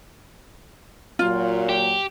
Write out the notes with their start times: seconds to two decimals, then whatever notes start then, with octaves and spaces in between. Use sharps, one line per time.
1.19 A#2 F#3 F4
1.69 G4